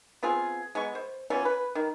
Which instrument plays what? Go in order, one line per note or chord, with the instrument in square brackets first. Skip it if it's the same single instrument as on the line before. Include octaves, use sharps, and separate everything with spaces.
[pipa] B3 C4 F4 G#4
G#3 B3 C#6
C5
E3 F3 B3 C#4
B4
D#3